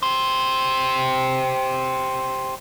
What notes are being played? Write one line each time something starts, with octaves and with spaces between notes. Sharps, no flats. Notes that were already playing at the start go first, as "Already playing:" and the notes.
G4 C5